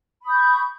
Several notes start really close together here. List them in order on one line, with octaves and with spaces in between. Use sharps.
B5 D#6 G6 C#6